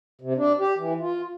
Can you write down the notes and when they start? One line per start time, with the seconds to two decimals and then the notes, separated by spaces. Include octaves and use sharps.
0.21 C3
0.37 D4
0.60 G4
0.78 E3
1.00 F4